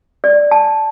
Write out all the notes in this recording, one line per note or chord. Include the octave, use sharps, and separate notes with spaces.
D5
A5